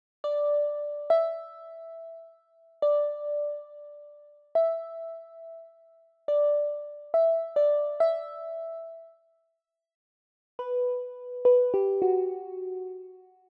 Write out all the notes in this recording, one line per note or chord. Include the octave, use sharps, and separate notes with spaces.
D5
E5
D5
E5
D5
E5
D5
E5
B4
B4
G4
F#4